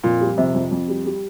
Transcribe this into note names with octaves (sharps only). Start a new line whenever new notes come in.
F2 A#2
G3
F2 C3
F2
F2
G3
G3